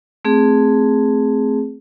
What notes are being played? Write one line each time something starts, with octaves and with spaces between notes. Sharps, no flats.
A3 C4 G#4